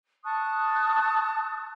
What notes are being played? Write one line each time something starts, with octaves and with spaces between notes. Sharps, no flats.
A5 C#6 D#6 F#6